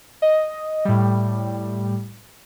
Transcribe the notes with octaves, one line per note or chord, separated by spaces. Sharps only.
D#5
A2 G3